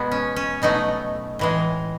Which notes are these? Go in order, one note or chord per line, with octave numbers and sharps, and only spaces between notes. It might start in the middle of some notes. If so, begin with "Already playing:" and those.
Already playing: B2 G#3 B3
C#4
C#4
B2 F#3 A3 D#4
A2 E3 G#3